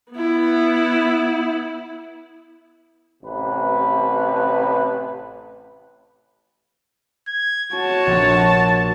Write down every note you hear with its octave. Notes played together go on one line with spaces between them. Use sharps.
B3 E4
A1 C3 B4
G#6
F#4 C#5 A5
A#1